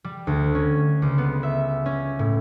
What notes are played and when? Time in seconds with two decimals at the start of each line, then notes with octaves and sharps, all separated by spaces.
0.04 G3
0.27 D2
0.55 C#4
1.02 C#2
1.18 B3
1.43 E5
1.86 C#4
2.19 A2